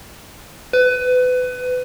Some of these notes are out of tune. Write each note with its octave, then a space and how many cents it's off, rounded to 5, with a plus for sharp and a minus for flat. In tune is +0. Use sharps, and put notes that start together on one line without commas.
B4 +25